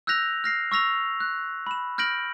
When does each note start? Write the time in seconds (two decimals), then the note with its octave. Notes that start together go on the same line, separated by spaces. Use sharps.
0.07 E6 F#6 G6 A#6 F7
0.44 F6 A#6 C7
0.72 C#6 E6 A#6 F7
1.20 F#6
1.67 B5 E7
1.98 F6 G6 A#6 D7 F#7